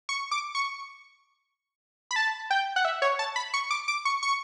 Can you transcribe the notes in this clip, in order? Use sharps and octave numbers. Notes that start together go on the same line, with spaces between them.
C#6
D6
C#6
B5
A5
G5
F#5
E5
C#5
A5
B5
C#6
D6
D6
C#6
C#6